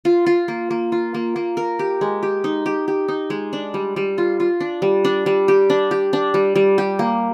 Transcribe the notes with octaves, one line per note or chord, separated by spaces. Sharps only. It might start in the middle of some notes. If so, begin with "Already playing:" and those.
F4
F4
A#3
A#3
F4
A#3
A#3
A#4
G4
G#3
G4
D#4
G4
G4
D#4
G#3
D4
G3
G3
F4
F4
D4
G3
D4
G3
G4
D4
G4
D4
G3
G3
G4
A#3